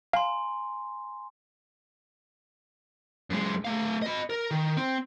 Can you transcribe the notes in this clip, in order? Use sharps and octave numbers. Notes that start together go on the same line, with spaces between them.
F5 G#5 A#5 C6
F#2 G#3
A3 F5
D#5 B5
A#4
D#3
C4